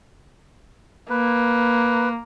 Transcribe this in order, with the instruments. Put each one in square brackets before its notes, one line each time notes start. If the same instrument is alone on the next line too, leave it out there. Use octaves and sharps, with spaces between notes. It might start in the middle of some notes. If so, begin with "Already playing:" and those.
[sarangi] A#3 [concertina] B4